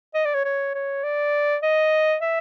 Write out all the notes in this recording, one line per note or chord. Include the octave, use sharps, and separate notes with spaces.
D#5
D5
C#5
C#5
C#5
D5
D#5
E5